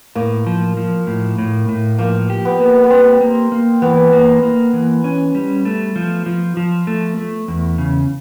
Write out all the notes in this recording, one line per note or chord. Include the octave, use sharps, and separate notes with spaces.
A2 A#3
F3
F3
A2
A2
A2
F3 A#3
G4
B3
A#3
B3
C4 G4
A#3
A#3
E3 B3
A#3
A#3
E3
C#4
G3
A3
F3
F3
F3
A3
A3
E2
C#3